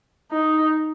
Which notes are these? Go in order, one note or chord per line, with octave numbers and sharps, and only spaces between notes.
D#4